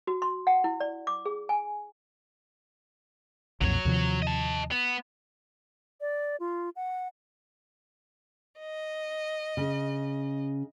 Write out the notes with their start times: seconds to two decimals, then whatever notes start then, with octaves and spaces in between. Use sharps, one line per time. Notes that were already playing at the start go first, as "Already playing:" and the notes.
0.07 F#4
0.22 C6
0.47 F#5
0.64 E4
0.80 D5
1.07 D6
1.26 G#4
1.49 G#5
3.61 B1 F2 A#2 F#3 C#5
3.85 D#2 C3 F3
4.22 D#5 A5
4.71 B3
6.01 D5
6.40 F4
6.76 F#5
8.59 D#5
9.57 C#3